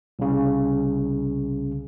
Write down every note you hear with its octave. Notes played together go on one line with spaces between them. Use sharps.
C2 C#3